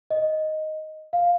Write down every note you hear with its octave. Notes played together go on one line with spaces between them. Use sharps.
D#5
F5